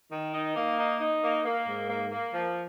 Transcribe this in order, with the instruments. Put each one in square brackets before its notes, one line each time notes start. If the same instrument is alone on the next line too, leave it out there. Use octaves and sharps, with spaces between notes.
[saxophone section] D#3
D#4
A#3
D#4
D#4
A#3
A#3
G#2
A#3
A#3
F3